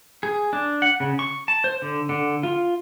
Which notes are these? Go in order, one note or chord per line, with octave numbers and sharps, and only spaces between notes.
G#4
D4
F#5
C#3
C#6
A5
C5
D3
D3
F4